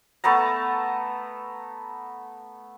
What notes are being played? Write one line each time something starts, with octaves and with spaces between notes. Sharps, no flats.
A3 B3 A5 A#5